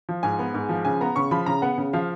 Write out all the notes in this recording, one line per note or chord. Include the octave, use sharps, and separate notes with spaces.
F3
G#2 G#5
B3
G#2
F3
C#3 G#5
B3 A#5
C#3 C#6
F3 B5
C#3 A#5
B3 F#5
C#3
F3 F5